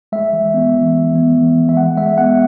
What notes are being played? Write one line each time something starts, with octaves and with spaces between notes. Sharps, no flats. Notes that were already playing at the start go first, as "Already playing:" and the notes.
G#3 E5
E3
B3
E3
E3
B3
E3
E3
E5
G#3 F#5
G#3 E5
B3 F#5